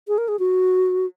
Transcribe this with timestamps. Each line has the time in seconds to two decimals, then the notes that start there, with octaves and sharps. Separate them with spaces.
0.08 G#4
0.18 A#4
0.28 G#4
0.39 F#4